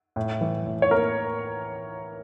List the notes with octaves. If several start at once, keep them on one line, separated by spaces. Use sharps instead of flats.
A2
E3
A2
C#5
A#3 A#4